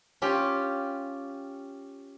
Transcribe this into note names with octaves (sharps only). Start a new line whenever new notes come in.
C#4 F4 G4